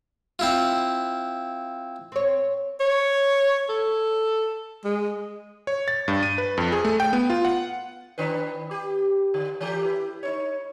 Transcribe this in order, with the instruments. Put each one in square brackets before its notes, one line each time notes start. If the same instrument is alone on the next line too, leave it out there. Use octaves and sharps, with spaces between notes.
[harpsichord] C4 E4 F4
[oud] C4 C#5
[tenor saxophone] C#5
A4
G#3
[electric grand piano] C#5
A6
G2
D#7
B4
F2
G#4
A3
G5
B3
F4
F#5
[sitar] D#3 D4 B4
G4
D3
E3 A3 G4
E4 B4
D#4 C#5